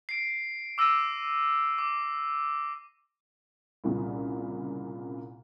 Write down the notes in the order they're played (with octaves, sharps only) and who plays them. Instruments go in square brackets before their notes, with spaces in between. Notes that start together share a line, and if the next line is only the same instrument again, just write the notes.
[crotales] C7 D7
D6 E6 A#6 C7 D#7
D6
[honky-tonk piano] C2 A#2 C#3